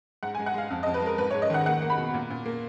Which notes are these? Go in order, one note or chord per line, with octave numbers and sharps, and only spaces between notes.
G#2 F#5
G#5
G#3
F#5
G#3 F5
F2
D#5
F2
B4
G#3 A#4
G#2 B4
C#5
G#2
D#5
D#3 F#5
A#3 F#5
A#3
B5
B2
A#2
A#2
A#3